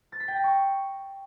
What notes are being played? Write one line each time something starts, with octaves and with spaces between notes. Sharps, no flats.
A6
B6
G5
A#6
C#6